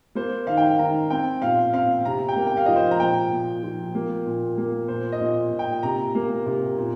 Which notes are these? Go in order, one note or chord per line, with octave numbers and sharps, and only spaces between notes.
A#3 C5
D#3 F5
G5
F5
D#3 A#5
C4 G5
A#2 F5
C4 F5
C3 A#5
G5
A#3
G5
F5
F3 D#5
C5
A#5
A#2 G5
A#2
F3
A#3
A#2
A#3
A#2 C5
D#5
A#2
A#2
G5
C3 A#5
A#3
C3
A#2